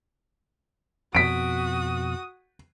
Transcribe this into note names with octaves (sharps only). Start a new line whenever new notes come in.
F2 B2 F#4 D#6 B6 D7